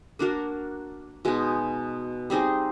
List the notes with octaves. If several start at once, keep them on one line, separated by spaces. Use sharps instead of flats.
A#3 D4 F#4 A#4
B2 G#3 B3 D#4
G3 C4 D#4 G#4